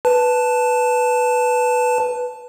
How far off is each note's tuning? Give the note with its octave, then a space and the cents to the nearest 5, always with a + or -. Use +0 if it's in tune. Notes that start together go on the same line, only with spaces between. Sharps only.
B4 +0 A5 +0